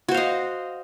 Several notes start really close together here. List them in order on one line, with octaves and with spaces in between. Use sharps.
F#4 C5 F5 D#5